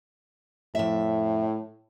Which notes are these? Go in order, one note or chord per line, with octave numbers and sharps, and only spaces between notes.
F2 A2 E5